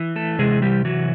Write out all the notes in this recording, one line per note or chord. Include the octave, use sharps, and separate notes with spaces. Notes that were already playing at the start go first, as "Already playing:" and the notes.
Already playing: E3
A3 A4
C3 G#3 G#4
G3 G4
E3 F#3 F#4